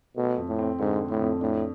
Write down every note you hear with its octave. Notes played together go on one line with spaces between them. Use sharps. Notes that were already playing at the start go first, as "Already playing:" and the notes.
B2 A3
F2
A2
C4
G#2 D3
A3
A2
F2
A2 D4